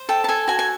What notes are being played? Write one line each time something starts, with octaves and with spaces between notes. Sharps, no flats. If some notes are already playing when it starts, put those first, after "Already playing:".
Already playing: C5
A4 G5
A5
A4 G#5
F#4 G#5
G#5